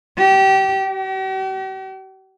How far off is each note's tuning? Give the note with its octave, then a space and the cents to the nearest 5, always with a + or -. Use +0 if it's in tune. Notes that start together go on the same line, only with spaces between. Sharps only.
G4 -25
G4 -45